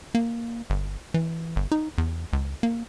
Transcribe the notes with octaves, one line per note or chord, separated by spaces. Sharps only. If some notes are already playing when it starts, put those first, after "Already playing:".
A#3
G1
E3
G1
D#4
E2
C#2
A#3